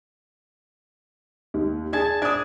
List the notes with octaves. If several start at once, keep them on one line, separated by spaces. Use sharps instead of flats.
D#2
D4 G#4 A5 G#6
D4 D#6 G#6